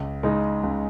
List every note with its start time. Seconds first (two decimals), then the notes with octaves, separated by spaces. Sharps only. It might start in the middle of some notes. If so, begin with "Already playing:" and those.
Already playing: C#2
0.23 C#3 G#3 D#4
0.63 C#2